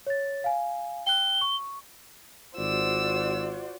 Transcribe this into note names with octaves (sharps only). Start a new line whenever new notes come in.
C#5 A6
F5 G#5
G5 F#6 G7
C#6
G#1 F4 F#4 C5 D5 E6